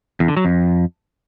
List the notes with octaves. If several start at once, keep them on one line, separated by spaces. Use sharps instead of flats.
E2
D3
F#3
F2